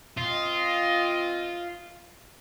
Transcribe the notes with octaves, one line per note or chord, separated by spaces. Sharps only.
C4 F4 D#5